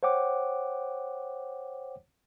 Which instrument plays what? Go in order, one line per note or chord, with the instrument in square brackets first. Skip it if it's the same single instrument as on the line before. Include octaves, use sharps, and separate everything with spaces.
[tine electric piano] C5 C#5 F#5 G5 D6